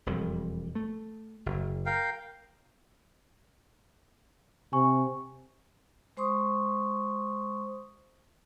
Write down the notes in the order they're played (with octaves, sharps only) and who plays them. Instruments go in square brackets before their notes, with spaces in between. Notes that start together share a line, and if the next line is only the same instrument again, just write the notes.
[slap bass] E1 F2 G3
A3
F#1
[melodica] A#4 F5 G5
[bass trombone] C3 [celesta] G#5 C#6
[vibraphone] G#3 C5 C6 C#6 D#6